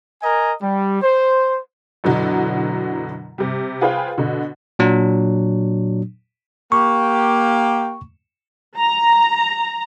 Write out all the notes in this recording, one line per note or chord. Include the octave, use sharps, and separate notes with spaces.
A#4 D#5 G#5 A#5
G3
C5
F#2 B2 D3 E3 F#3
C3 G3
F4 G#4 B4 C5 F5 G5
B2 D3
A#2 F#3 D4
A#3 G4 G5 C#6
A#5